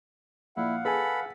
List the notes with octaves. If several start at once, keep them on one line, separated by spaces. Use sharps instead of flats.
A#1 E4 F5 F#5
G#4 A4 B4 G#5 B5